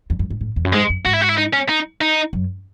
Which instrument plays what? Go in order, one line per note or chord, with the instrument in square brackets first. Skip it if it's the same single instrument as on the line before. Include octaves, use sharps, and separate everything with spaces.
[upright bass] E2
F#2
G#2
A2
E2
F#2
[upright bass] G#2 [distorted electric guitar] G#3
[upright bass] F#2
[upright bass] G#2 [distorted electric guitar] F#4
[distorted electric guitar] E4
F#4
E4
D#4
C#4
D#4
D#4
[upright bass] F#2